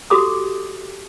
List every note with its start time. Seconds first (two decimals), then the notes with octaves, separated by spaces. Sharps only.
0.10 F#4 G4 A4 D6 D#6